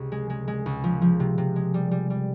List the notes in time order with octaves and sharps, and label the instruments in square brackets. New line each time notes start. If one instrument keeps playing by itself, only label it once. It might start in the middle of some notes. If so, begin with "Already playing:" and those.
Already playing: [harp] C#2 C3
G#3
G#3
G#3
C#2
F3
F3
C3
C3
G#3
G3
G3
G3